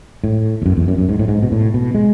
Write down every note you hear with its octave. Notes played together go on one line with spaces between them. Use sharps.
A2
E2
F#2
E2
F#2
F#2
G#2
A2
G#2
B2
A2
B2
G#3